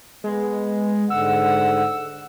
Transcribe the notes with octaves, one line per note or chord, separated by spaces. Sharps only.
G#3 B3
G#2 D3 F#5 E6